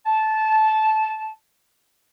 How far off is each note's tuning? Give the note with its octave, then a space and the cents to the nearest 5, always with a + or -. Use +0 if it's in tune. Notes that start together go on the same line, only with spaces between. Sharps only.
A5 -15